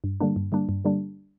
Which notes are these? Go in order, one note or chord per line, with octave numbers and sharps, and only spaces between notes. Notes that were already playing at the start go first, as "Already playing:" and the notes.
G2
D3 G3 A#3 D4
G2
D3 G3 A#3 D4
G2
D3 G3 A#3 D4